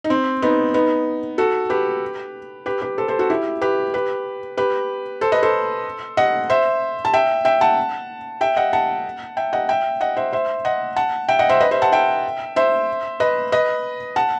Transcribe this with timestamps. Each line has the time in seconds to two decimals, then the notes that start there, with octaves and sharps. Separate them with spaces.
0.04 D#4
0.10 C4
0.42 B3 D#4
0.74 B3 D#4
1.38 F#4 A4
1.70 G4 B4
2.66 G4 B4
2.82 G4 B4
2.98 A4 C5
3.08 A4 C5
3.19 F#4 A4
3.30 E4 G4
3.61 G4 B4
3.94 G4 B4
4.57 G4 B4
5.21 A4 C5
5.32 B4 D#5
5.43 A4 C5
6.17 D#5 F#5
6.50 C5 E5
7.05 A5
7.14 E5 G5
7.45 E5 G5
7.61 F#5 A5
8.41 E5 G5
8.56 D#5 F#5
8.73 F#5 A5
9.37 E5 G5
9.53 D#5 F#5
9.69 E5 G5
10.01 D#5 F#5
10.17 C5 E5
10.33 C5 E5
10.65 D#5 F#5
10.96 F#5 A5
11.29 E5 G5
11.39 D#5 F#5
11.49 C5 E5
11.60 B4 D#5
11.71 C5 E5
11.82 F#5 A5
11.92 E5 G5
12.56 C5 E5
13.20 B4 D#5
13.52 B4 D#5
14.16 F#5 A5